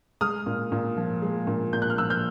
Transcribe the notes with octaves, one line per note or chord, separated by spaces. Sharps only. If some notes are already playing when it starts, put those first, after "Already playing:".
G#3 D#6 F6
A#2
A#2
F3
G#3
A#2
A#2 G6
F#6
F6
F3 E6 F#6
F6 G6